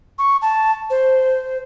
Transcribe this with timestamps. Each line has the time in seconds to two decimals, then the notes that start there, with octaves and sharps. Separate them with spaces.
0.19 C#6
0.42 A5
0.90 C5